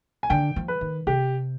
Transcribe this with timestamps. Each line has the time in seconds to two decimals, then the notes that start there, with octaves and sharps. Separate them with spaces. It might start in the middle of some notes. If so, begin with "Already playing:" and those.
0.23 G#5
0.30 D3 G5
0.56 F3
0.68 B4
0.81 D#3
1.07 C3 G4